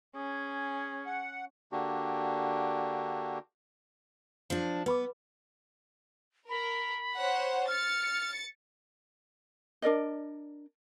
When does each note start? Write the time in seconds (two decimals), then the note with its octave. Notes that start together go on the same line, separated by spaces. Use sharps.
0.16 C#4 G#4
1.06 F#5
1.72 D3 A#3 D4 F#4 G4
4.50 F3 D4
4.86 B3 B4 B5 D6
6.49 A#4 B5
7.14 C5 C#5 F#5
7.68 F6 A6 C#7
9.82 D4 A#4 D5 D#5